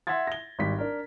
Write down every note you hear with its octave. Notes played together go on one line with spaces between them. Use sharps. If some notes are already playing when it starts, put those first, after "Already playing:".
E5 F#5 C6 G#6 A6
A#6 G7
G#1 G3 B6
D4 A#4